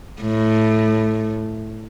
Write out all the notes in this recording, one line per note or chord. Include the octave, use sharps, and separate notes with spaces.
A2